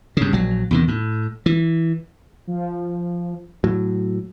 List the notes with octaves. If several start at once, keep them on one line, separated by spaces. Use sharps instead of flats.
G2 C#3
A#1 F#3
E2 C3 D#3
A2
E3
F3
A2 F#3